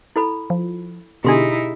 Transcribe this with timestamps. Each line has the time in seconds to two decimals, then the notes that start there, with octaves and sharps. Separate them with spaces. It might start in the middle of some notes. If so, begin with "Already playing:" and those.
0.16 E4 A4 B5
0.50 F3
1.24 B2 D3 D#4 E4 G4 G#4 C6